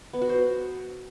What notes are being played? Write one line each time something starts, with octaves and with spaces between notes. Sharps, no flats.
B3
F#4
C5